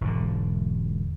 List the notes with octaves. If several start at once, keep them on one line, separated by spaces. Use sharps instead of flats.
E1 G#2 D3